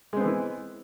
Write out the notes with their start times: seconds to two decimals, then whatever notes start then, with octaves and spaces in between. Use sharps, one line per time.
0.13 G#3
0.17 C4
0.20 B3
0.24 E3
0.28 E4